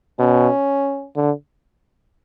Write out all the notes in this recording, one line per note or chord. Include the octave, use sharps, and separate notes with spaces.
B2 C#4
D3